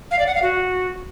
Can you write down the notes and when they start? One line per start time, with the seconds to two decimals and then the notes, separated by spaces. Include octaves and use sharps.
0.11 F5
0.19 D5
0.27 F#5
0.34 F5
0.42 F#4